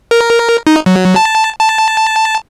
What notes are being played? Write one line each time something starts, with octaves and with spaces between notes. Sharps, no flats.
A#4
D#4
F#3
A5
A5